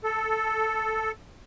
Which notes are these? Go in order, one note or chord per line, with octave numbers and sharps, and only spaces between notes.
A4